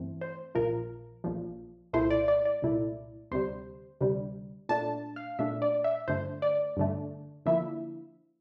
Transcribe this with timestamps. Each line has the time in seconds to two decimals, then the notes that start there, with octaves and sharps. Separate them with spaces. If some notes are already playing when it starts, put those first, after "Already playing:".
Already playing: G2 E3 A3 C4
0.21 C5
0.55 A#1 A#2 F3 A#4
1.24 A#1 A#2 F3
1.93 C2 A#2 A3 E4 C5
2.11 D5
2.28 D5
2.45 D5
2.62 C2 A#2 A3 E4
3.31 D2 C3 G3 C5
4.01 D2 C3 G3
4.69 A#2 A3 D4 A5
5.16 F5
5.39 A#2 A3 D4 E5
5.62 D5
5.84 E5
6.08 G2 D3 A3 C5
6.42 D5
6.77 G2 D3 A3
7.46 D3 F3 A#3 E4 E5